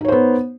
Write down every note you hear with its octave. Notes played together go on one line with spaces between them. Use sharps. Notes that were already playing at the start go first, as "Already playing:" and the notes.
B3 D#4 C5 C#5